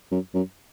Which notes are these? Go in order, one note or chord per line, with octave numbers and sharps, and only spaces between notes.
F#2
F#2